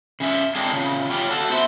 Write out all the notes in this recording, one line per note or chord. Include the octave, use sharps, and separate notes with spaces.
C#3 C#4 E5
G#3 A#3 C4 D4
A#2 C#3
C#3 C#4 F4 G4
F#4 A4
B3 C4 C5 E5